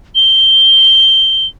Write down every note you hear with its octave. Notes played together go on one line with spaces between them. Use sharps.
G7